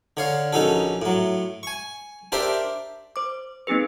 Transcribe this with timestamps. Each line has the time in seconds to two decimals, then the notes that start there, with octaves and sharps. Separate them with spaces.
0.17 D3 C#5 F5
0.53 A#1 C#4 D#4 F#4 A4
1.02 A2 F#3
1.63 G#5 C#6
2.32 D4 G4 A#4 C5 D5 E5
3.16 C5 D6
3.67 A#3 C4 D#4 G#4 B4